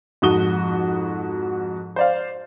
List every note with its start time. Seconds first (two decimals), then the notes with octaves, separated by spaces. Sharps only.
0.22 F2 G#2 F#4 D#6 G7
1.96 C5 D5 F5